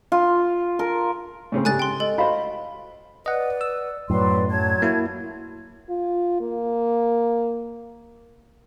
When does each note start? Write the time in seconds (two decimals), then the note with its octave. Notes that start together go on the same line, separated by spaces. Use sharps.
0.12 F4
0.79 A#4
1.52 A2 C#3 C4
1.65 G#2 C#3 G3 A4 G#5 F#6 A6
1.79 G5 C6
2.00 A4 D#5
2.18 F#4 C5 D#5 F5 B5
3.26 B4 D5 D#5 F#5
3.61 E6
4.10 F#2 A2 F#3 B4 D5 C6
4.50 F#3 A5 G#6
4.82 A#3 E4 F#4
5.90 F4
6.41 A#3